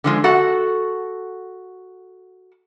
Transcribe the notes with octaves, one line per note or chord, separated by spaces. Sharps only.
D3 F3 G#3
F#4 A4 F#5